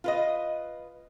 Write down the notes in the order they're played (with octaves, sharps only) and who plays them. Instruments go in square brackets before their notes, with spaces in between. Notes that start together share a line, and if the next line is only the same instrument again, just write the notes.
[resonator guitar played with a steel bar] F4 B4 D#5